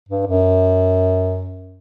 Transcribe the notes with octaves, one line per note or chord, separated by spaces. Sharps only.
G2
F#2